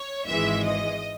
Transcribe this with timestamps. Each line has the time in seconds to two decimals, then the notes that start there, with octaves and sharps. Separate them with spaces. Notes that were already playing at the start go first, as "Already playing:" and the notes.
Already playing: C#5
0.27 G#1 G#2 E3 G#3 E5
0.64 D#5